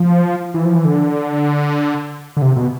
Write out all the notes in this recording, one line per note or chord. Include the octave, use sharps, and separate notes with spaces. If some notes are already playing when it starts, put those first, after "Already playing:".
Already playing: F3
E3
F3
E3
D3
D3
C3
B2